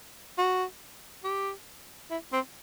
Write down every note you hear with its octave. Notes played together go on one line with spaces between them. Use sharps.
F#4
G4
E4
C4